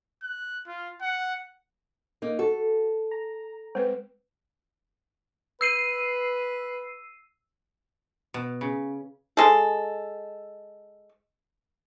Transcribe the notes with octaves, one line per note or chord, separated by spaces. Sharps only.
F#6
F4
F#5
A#3 D#4
F#4 A4
A#5
G#3 C4 B4
B4 E6 C7 D#7
B2
C#3
G#3 A4